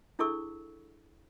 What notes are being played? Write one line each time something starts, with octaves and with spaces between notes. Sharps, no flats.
D4 E4 G#4 A4 C#6 E6